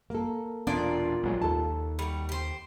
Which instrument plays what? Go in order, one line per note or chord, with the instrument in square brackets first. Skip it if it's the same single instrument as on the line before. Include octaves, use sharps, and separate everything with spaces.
[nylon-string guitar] A#3 A4
[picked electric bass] E1 B3 D4 [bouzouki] A#2 F4 D5
[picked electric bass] A#1 F#3 G#3
[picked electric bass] D#2 [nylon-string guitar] A4 A5
[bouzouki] G3 F#4
G4 C5